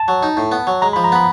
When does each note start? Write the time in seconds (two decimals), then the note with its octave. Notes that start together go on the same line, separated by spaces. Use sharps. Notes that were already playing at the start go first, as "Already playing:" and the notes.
Already playing: A5
0.08 F#3
0.23 D#4
0.37 A2
0.52 B3
0.67 F#3
0.82 G#3 A#5
0.93 B5
0.96 F3
1.04 A#5
1.12 B3 B5